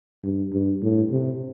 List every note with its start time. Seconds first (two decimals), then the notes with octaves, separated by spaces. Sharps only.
0.24 G2
0.52 G2
0.82 A2
1.11 C3